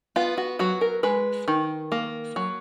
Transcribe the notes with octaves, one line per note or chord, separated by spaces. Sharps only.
B3 F4
F#4
F#3 F#4
A#4
G#3 B4
D#3
A#3
F#3